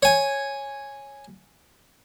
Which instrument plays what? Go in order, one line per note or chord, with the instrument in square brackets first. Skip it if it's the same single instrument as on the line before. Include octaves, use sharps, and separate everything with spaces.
[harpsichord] C#5 G#5